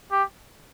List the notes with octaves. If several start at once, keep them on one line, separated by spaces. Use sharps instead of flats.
G4